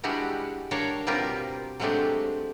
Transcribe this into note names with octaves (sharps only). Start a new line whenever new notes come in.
G3 G#3 D4 E4 F#4 G4
D4 A#4 C#5 F5 G5 A5
B2 G3 C4 F4 G4 A#4
F#3 G#3 A3 C4 D4 G4